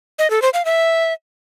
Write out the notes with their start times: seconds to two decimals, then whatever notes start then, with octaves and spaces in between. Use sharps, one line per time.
0.19 D#5
0.30 A4
0.42 C5
0.54 F5
0.65 E5